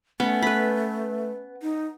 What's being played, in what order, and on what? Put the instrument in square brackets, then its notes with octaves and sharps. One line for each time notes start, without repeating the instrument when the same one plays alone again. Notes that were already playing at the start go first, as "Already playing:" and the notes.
[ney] A3 [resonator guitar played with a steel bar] B3 [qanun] C#4
[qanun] B4 B5
[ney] D#4